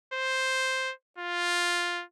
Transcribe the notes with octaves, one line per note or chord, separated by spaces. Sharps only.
C5
F4